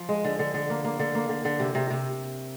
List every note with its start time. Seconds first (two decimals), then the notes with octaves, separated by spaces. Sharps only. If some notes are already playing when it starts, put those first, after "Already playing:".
Already playing: F3
0.09 G#3
0.24 D3
0.39 D3
0.54 D3
0.70 A#3
0.84 A#3
0.99 D3
1.15 A#3
1.29 D3
1.45 D3
1.60 C3
1.75 C3
1.90 C3